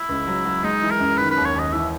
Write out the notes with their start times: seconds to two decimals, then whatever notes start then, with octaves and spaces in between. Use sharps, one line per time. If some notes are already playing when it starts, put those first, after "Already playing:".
Already playing: E4
0.09 C#2
0.27 F#3
0.45 F#3
0.63 G#3 D#4
0.82 E3
0.91 A#4
1.00 F#2
1.17 D#3 B4
1.31 B4
1.37 D#2
1.45 C#5
1.55 D#2 D#5
1.72 E3 E5